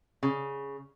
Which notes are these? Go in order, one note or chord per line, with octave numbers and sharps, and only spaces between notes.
C#3